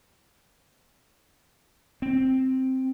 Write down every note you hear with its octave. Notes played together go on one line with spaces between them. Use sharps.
C4